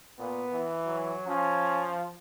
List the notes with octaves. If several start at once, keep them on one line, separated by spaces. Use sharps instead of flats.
A#2 B3
E3
F#3
F3 C#4